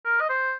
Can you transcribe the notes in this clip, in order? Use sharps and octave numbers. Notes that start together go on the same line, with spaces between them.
A#4
D#5
C5